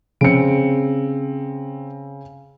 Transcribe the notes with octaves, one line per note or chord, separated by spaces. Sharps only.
C#3 C4 C#7 D7